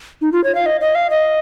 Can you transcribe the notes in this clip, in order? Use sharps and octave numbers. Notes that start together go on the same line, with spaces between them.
D#4
F4
C#5
F5
D#5
D#5
F5
D#5